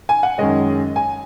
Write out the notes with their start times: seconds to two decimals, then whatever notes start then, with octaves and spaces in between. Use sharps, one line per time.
0.09 G#5
0.23 F#5
0.38 F#2 D#3 G#3 C#4 D#5
0.96 G#5